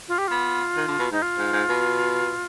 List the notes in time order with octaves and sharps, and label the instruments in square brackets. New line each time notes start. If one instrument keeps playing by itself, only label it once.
[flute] F4
G4
[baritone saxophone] B3 [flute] F4
[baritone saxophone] D#3
D3
B2
[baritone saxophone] G#2 [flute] D#4
[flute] F4
[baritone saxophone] G#2
G#2
B2